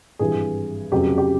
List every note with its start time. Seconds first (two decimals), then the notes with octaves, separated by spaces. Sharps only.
0.19 G#1 G2 E3 G3 G#4
0.91 F1 F2 C#3 F#3 G4
1.18 G4